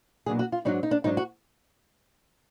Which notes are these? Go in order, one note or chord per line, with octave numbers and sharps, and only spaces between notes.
B2 F#3 A#3 D4 G#4
F#4
F4
G#2 F#3 D4 D#4
D#4
D4
G#2 F#3 D4 D#4
F#4